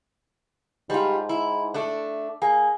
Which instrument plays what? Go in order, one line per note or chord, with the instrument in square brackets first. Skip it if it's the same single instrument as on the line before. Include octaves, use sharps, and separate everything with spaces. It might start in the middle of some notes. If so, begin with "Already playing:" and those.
[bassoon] G#2 [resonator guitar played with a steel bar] G3 F4
[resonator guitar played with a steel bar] E4
A3 D4
[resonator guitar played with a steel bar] A#3 [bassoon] G#4